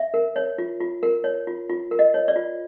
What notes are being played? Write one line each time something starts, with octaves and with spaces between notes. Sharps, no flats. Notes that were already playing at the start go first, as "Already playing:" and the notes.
Already playing: E5
A#4
C#5
F4
F4
A#4
C#5
F4
F4
A#4
D#5
C#5
D5
F4